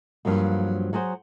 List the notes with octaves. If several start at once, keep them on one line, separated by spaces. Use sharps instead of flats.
G2 F3 F#3 A#3
F#3 F#4 G#4 C5